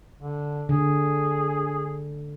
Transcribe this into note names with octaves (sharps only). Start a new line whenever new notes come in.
D3
D3 G#4